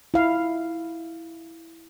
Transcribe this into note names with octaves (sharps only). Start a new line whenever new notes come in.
E4 F5